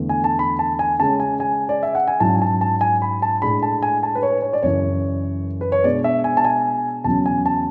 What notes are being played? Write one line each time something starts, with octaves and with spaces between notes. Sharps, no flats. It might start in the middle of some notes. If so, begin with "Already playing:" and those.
Already playing: E2 D3 A3
G#5
A5
B5
A5
G#5
C#3 G#3 C#4 A5
G#5
G#5
D5
E5
F#5
G#5
G#2 F#3 C#4 E4 A5
G#5
A5
A5
G#5
B5
A5
A2 G#3 D4 B5
A5
G#5
A5
B4
C#5
C#5
D5
F#2 C#3 E3 C#5
B4
C#5
B2 G#3 D4 D5
E5
G#5
A5
G#5
E2 C#3 F#3 C#4 A5
G#5
A5